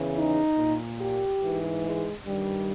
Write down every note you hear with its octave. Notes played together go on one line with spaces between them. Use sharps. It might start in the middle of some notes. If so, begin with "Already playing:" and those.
Already playing: E2 C#3 E3
D#4
A#2
G4
G#2 E3
G#3
G2 D#3 G3